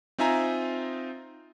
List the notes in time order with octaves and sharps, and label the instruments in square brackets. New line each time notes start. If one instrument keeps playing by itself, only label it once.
[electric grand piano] C4 D#4 F4 E5 G#5 A#5